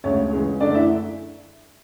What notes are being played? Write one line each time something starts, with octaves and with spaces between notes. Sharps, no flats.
D2 C#3 G#3 C#5
C#2 C#3 E3 G#3
F#2 D3 A3 D4 D5
E4 E5